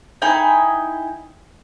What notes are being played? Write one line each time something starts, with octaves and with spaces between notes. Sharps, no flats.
D#4 E4 G5 G#5